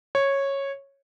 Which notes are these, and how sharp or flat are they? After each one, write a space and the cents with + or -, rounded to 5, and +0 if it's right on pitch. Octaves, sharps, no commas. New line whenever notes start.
C#5 -10